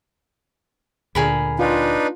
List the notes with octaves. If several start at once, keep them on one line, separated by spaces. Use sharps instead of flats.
D2 A#2 D3 G#4 A#4 B5
D4 D#4 F4 B4